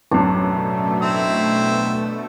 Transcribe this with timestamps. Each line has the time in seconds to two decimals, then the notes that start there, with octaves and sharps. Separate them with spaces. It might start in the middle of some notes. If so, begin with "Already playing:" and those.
0.11 A1 F#2 B2 A3 D4
1.02 C4 E4 E6